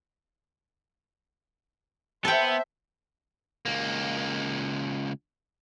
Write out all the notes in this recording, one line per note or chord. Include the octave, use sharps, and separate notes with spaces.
B3 A4 C5 E5 G5
C#2 A#3